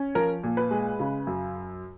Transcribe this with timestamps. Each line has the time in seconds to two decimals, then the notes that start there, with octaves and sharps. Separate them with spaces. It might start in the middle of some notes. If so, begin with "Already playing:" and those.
Already playing: C#4
0.15 F3 A#4
0.43 A#2
0.57 B4
0.71 G#3
0.99 C#3
1.27 F#2